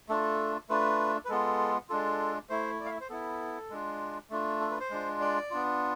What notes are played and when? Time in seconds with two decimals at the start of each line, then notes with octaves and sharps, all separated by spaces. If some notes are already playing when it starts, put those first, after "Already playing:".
0.09 A3 D4 F4 A4
0.69 A3 D4 F4 B4
1.25 B4
1.29 G#3 B3 F4 A4
1.89 G#3 D4 F4 A4
2.49 A3 E4 C5
2.80 D5
2.85 F5
2.90 E5
3.01 C5
3.10 B3 E4 A4
3.70 G#3 D4 F4
4.30 A3 D4 F4
4.60 A4
4.71 B4
4.80 C5
4.90 G#3 D4 F4
5.21 D5
5.51 B3 D4 F4